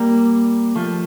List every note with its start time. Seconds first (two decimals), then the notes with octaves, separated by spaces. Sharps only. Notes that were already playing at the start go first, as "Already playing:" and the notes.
Already playing: G3 A#3
0.76 F3 A3